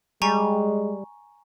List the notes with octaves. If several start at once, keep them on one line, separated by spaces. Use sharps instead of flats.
G3 G#3 G#5 A#5 C#6